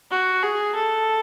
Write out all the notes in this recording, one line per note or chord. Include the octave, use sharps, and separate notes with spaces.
F#4
G#4
A4